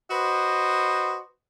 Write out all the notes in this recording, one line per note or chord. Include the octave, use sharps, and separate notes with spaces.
F#4 B4 C5 D#5